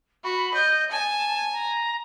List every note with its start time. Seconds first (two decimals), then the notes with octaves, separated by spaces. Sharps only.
0.24 F#4 B5
0.54 D#5 G6
0.91 G#5 A5
1.52 A#5